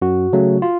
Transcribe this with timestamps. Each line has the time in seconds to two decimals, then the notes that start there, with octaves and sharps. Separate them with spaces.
0.02 F#2 F#4
0.33 C#3 F#3 A3
0.62 F4